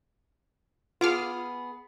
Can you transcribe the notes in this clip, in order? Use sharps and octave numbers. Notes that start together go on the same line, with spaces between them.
B3 F4 G#4 D6 F6